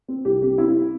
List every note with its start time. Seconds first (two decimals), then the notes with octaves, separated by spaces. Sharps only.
0.08 C4
0.25 C2 G4
0.42 C3 G4
0.58 C4 E4